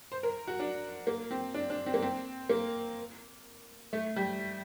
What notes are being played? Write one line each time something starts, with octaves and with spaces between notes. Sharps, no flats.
C5
A#4
F#4
D4
A#3
C4
D4
D4
C4
A#3
C4
A#3
A3
G3